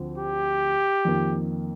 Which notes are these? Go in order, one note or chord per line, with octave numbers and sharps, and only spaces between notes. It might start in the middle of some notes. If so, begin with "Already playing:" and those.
Already playing: D2 D3 F3 C4
G4
F2 D#3 A#3